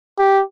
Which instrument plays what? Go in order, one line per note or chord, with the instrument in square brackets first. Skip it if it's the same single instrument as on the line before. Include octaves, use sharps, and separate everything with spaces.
[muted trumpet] G4